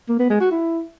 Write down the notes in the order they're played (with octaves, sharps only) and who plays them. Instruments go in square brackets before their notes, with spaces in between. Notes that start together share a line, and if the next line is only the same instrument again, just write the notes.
[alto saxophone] A#3
B3
G#3
F#4
E4